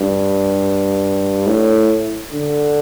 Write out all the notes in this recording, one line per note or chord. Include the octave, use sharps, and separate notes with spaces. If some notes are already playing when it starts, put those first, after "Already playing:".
Already playing: G2
A2
D3